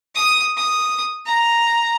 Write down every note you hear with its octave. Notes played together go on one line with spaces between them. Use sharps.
D#6
D#6
A#5